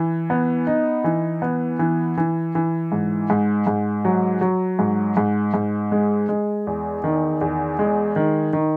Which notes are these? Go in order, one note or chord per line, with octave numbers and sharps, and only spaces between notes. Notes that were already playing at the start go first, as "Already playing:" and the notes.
Already playing: E3
B3
D#4
E3
B3
E3
E3
E3
G#2
G#2
G#2
F#3
F#3
G#2
G#2
G#2
G#3
G#3
E2
D#3
E2
G#3
D#3
D#3